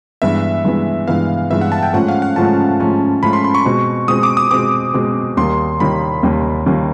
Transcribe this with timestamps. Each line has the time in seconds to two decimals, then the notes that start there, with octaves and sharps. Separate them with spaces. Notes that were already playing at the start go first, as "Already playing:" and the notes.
0.22 G2 E3 G#3 B3 E5
0.65 G2 E3 G#3 B3
1.08 G2 E3 G#3 B3 F5
1.50 G2 E3 G#3 B3 E5
1.61 F#5
1.72 A5
1.83 G5
1.93 G#2 F3 A3 C#4 F4 F#5
2.08 F5
2.22 F#5
2.36 G#2 F3 A3 C#4 F4 A5
2.80 G#2 F3 A3 C#4 F4
3.23 G#2 F3 A3 C#4 F4 B5
3.33 C6
3.44 C6
3.55 C#6
3.65 B2 G#3 C4
4.08 B2 G#3 C4 D#6
4.23 D6
4.37 D#6
4.51 B2 G#3 C4 D6
4.94 B2 G#3 C4
5.37 D#2 D#3 G3 A#3 C6
5.80 D#2 D#3 G3 A#3 B5
6.23 D#2 D#3 G3 A#3
6.66 D#2 D#3 G3 A#3